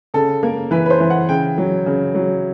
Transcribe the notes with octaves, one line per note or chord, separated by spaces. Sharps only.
C#3 A4
A#3 A#4
E3 B4
B4
C5
E3
F#5
C#3 G5
F#3
C#3
F#3